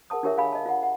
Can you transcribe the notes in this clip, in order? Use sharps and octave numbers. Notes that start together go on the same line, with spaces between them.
G#4 A#4 F#5 A5 D#6
D4 F4 G4 A#4 C#5 E5
G4 G#4 F5 G#5 B5
D#5 A5
F4 F#5
F#5